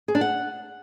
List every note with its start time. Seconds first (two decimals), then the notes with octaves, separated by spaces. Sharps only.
0.08 G#4
0.15 D4
0.21 F#5